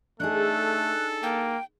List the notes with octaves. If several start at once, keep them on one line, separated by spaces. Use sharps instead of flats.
A3 D4 D#4 G#4 A4 F#6
A#3 G5